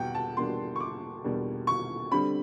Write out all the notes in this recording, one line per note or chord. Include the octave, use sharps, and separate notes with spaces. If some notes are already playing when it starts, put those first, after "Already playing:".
Already playing: E2 B2 G3 F#5 G5
A5
E2 B2 G3 A#3 D4 C6
C#6
D6
E2 B2 G3 A#3 D4
C#6
D3 G3 C4 B5